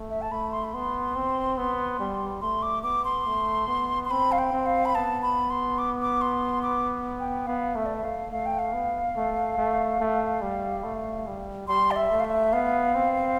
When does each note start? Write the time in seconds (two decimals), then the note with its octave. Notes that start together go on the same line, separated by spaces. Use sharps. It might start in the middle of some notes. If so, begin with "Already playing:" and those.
Already playing: A3
0.10 E5
0.22 A5
0.31 A3 B5
0.52 C6
0.64 B5
0.74 B3 C6
1.16 C4
1.58 B3
2.00 G3
2.41 A3 C6
2.62 D6
2.83 B3 D6
3.05 C6
3.26 A3
3.68 B3
4.05 C6
4.10 C4 B5
4.32 F5
4.38 G5
4.53 C4
4.66 F5
4.85 B5
4.95 B3 A5
5.22 B5
5.50 C6
5.78 D6
6.02 D6
6.21 C6
6.63 D6
7.20 G5
7.47 B3 F5
7.75 A3 E5
7.86 D5
7.95 E5
8.03 A3 F5
8.31 A3 F5
8.46 G5
8.59 F5
8.73 B3
9.16 A3
9.58 A3
10.00 A3
10.42 G3
10.84 A3
11.27 G3
11.68 G3 C6
11.91 D5
11.96 E5
12.10 A3
12.20 F5
12.25 E5
12.53 B3 F5
12.95 C4